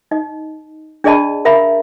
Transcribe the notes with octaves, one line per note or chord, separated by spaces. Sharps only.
D#4 D#5
D4 G#4 D5 D#5 A5 B5
A#4 E5 F5 A#5 B5